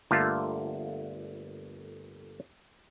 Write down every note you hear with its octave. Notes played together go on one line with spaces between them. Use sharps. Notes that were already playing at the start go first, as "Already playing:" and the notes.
G1 D3 A3 A#3 F4 A5